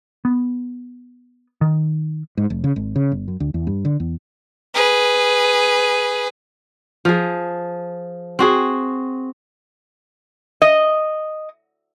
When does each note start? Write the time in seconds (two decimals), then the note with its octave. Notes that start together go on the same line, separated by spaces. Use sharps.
0.25 B3
1.61 D#3
2.37 G#2
2.50 F1
2.64 C#3
2.76 G#1
2.96 C#3
3.12 G1
3.28 F#2
3.40 D2
3.54 E2
3.67 G2
3.85 D3
4.00 E2
4.74 G#4 B4
7.05 F3 G#4
8.39 C4 F#4 G#4
10.62 D#5